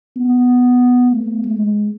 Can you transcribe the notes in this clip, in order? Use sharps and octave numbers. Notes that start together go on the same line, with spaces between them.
B3
A3
G#3